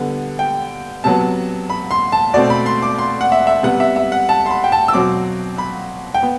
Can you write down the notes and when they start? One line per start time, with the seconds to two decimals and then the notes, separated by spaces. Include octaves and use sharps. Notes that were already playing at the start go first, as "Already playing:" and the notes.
Already playing: D3 G3 B3
0.39 G5
1.04 C3 F#3 B3 A5
1.70 B5
1.91 C6
2.12 A5
2.33 B2 A3 C4 D5
2.50 B5
2.66 C6
2.82 D6
2.99 C6
3.21 F#5
3.32 E5
3.47 E5
3.63 C3 G3 B3 F#5
3.80 E5
3.96 E5
4.12 F#5
4.29 A5
4.46 C6
4.50 B5
4.64 G5
4.72 A5
4.88 E6
4.93 B2 F#3 C4 D6
5.58 B5
6.14 G5
6.23 B3